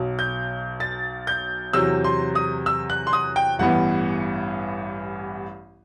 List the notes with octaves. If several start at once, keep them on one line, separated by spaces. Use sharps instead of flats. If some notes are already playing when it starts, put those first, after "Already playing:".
Already playing: B1 B2 F#3
G6
A6
G6
E2 C3 F#3 E6
C6
D#6
E6
F#6
C6
D#6
G5
A1 G2 E3 B3 F#5